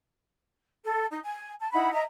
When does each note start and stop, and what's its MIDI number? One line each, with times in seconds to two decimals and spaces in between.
0.84 1.05 69
1.10 1.19 63
1.23 1.53 80
1.59 1.69 81
1.72 1.91 63
1.72 1.91 64
1.72 1.91 78
1.72 1.91 83
1.92 2.02 75
1.92 2.02 76
1.92 2.02 82